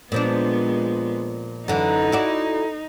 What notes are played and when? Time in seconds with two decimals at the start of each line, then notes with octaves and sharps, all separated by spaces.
0.12 A#2 F3 G#3 B3 D4
1.68 F#2 D3 E3 D#4 A4 A#5
2.12 E4 F#4 D5